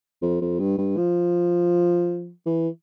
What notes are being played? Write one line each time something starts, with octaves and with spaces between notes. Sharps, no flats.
F2
F2
G2
G2
F3
E3